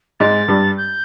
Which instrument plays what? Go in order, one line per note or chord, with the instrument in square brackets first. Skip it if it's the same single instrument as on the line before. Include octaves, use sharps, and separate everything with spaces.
[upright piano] G#2 G#3 [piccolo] A6
[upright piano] G2 G3
[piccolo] G6